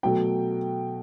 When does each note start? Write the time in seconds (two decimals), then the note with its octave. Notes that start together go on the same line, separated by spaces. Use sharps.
0.03 B2 F#3 A3 G5